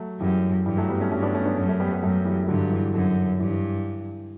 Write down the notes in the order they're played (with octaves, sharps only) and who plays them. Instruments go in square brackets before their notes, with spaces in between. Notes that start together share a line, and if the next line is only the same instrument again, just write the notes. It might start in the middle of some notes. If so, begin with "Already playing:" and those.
Already playing: [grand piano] F#3 A3
[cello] F#2 [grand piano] E3 G3
[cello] G2 [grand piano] E3 G3
[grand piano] F#3 A3
G3 B3
A3 C#4
[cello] G2 [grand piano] A3 C#4
[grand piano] B3 D4
A3 C#4
B3 D4
[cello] F#2 [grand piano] A3 C#4
[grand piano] A3 C#4
G3 B3
G3 B3
[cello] F#2 [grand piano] F#3 A3
[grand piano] E3 G3
E3
[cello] G2 [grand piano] D3 F#3
[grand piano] E3
[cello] F#2 [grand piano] D3
[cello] G2 [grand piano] E3
[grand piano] E3